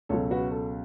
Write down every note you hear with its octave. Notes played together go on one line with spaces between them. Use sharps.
C#2 B2 F#3 A4 C#5
F#4 B4
A4